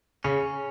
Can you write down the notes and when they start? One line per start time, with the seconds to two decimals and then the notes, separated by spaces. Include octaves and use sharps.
0.24 C#3 C#4